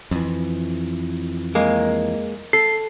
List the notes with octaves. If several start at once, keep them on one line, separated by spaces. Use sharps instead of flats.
F2 E3
G#3 A#3
A4 C7